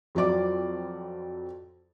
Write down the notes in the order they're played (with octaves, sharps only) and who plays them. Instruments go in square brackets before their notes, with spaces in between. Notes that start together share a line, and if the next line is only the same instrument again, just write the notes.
[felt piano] F2 F#3 F4 D5 D6